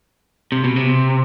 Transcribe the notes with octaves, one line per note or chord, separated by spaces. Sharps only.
C3
B2
C3